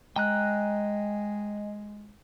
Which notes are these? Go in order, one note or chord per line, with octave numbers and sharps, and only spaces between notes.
G#3 D#5 G5 G#5 A#5 F#6